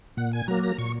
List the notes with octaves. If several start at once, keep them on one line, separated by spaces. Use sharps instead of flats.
A#2 F#5
G#5
F#3 A#3 A#5
A#5
A#2 C#6